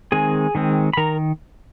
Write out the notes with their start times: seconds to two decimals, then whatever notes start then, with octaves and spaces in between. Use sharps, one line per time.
0.12 D#3 G#3 C4 G#4 G#5
0.55 D#3 G#3 C4
0.93 B5
0.97 D#3 A#4 A#5